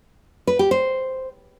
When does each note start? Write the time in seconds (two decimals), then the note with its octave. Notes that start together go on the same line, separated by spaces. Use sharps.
0.47 B4
0.59 G4
0.71 C5